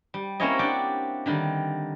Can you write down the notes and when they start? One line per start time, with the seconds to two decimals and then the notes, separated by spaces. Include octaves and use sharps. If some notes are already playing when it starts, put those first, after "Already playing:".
0.14 G3
0.40 A#3 C4 C#4 E4 C#5 D#5
0.59 D4 G4 D5 F#5
1.26 D3 D#3 G3